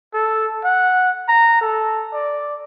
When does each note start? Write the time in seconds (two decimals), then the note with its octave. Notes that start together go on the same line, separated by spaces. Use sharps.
0.14 A4
0.64 F#5
1.28 A#5
1.61 A4
2.14 D5